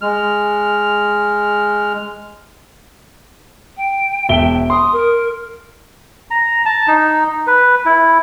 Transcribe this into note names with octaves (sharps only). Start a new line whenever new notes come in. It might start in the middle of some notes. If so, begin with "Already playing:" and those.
G#3 F6
G5
E1 E5 G7
C6 D#6
A#4
A#5
A5
D#4
B4
E4